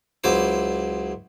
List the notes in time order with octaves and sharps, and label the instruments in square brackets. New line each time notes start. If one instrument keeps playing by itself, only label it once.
[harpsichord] C#2 F#3 E4 C5 D6